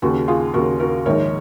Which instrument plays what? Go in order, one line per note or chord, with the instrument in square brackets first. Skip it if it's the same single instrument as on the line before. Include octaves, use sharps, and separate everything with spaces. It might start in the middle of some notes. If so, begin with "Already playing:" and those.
[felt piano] D#2 C#3 F#4
F4 G#4
D#2 C#3 F#4 A#4
F#4 A#4
A#1 G#2 D#3 A#4 C#5